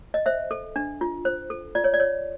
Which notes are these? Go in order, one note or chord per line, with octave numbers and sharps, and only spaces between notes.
D#5
C5 E5
A4
D4
F4
C5
A4
F4 D5
C#5
D5
C#5